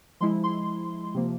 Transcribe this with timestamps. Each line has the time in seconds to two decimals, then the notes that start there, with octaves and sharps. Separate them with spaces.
0.20 F3 G#3 E4 C6
0.43 C6
1.14 C3 F3 A#3